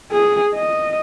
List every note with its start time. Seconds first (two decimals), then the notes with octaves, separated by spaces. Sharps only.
0.12 G#4
0.54 D#5